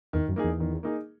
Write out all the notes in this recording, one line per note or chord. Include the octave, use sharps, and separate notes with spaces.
E2 D#3
F#2
A#3 D#4 G#4
E2
D#3
A#3 D#4 G#4